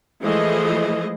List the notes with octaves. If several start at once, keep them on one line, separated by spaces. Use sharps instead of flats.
E3 F3 G#3 A3 G#4 D#5